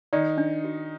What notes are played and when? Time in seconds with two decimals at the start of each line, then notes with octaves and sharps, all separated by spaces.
0.13 D#3 D#4 D5
0.38 D4
0.65 F#4